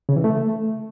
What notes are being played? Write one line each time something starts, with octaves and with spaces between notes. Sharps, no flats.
C#3
E3
A3